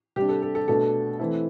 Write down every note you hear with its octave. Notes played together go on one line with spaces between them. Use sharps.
C3 G3 D4 G4
A4
A4
A4
B2 A3 D4 A4
E3 A3 C4 E4